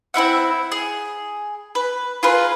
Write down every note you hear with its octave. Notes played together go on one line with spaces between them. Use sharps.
C4 E4 E5 F#5
G#4
B4
F4 G#4 A#4 B4